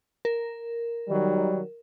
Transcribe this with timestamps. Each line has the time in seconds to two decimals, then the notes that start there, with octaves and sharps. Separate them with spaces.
0.25 A#4
1.09 D#3 F#3 G3